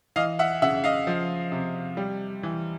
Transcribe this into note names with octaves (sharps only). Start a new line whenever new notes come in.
E3 D#5 F5
E5 F#5
C#3 E5 F#5
D#5 F5
F3
C3
G3
E3